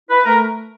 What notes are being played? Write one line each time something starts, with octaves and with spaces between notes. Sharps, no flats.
E4 B4
A3 A#4